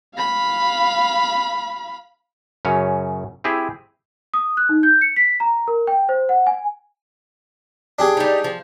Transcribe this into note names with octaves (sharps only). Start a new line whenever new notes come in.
F5 B5
F#2 C#3 C#4 C#5
C4 E4 G4 G#4
D#6
F#6
D#4
G6
C#7
B6
A#5
A#4
G5
C5
F#5
G#5
D4 G4 G#4
G3 D#4
F3